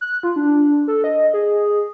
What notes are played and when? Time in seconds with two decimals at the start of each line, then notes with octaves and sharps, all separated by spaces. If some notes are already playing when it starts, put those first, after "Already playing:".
0.01 F#6
0.23 F4
0.36 D4
0.88 A4
1.04 D#5
1.34 G#4